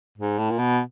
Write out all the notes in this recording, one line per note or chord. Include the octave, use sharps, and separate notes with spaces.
G#2
A2
A#2
B2